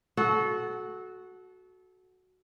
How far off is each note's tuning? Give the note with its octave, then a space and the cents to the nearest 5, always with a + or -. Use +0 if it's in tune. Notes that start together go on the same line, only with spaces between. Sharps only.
F#4 +0 A4 -25